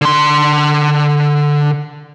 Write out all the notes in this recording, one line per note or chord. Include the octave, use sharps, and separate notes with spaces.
D3 C6